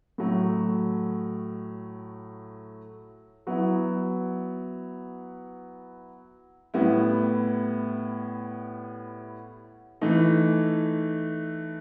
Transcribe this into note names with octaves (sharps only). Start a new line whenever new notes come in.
A2 F#3 A3
F#3 B3 E4
A2 G3 B3 E4
E3 A3 D#4